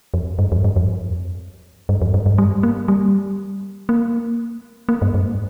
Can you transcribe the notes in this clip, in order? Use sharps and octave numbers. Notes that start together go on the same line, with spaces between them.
F2
G2
F2
G2
F2
G2
F2
G2
G2
G3
A#3
G3
A#3
A#3
G2
G2